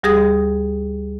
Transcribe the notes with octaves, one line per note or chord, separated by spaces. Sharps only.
D2 G3 G4 G#4 D#6 A#6